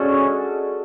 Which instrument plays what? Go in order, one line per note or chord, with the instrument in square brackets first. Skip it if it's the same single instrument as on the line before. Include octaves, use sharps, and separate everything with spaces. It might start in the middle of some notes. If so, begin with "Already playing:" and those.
Already playing: [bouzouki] G#3 D4 F#4 A4 [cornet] C#4